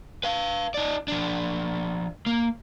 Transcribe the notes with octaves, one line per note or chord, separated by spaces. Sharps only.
B4 F5
D#4 D5
F3 D4
A#3